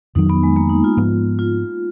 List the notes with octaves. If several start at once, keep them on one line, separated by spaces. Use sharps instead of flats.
F2 D#3 F#3 D#4
B3
G#3
A#3
D#4
F4
G#2 F3 G#3 B3
F4